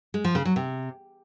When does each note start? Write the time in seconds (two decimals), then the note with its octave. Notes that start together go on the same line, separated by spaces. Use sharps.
0.14 G#3
0.24 F3
0.35 C#3
0.45 F#3
0.56 C3